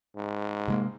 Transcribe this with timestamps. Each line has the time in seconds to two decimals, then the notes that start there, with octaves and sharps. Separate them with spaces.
0.16 G#2
0.68 C3 G#3 A#3